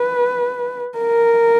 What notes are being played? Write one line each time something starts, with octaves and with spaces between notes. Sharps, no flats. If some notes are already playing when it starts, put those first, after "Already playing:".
Already playing: B4
A#4